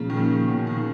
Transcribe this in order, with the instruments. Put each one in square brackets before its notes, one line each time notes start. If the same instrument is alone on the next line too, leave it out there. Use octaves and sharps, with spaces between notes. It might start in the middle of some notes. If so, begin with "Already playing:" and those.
Already playing: [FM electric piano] A#2 F3 A#3 [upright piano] C#3
[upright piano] D#3
C#3
B2
D#3
C#3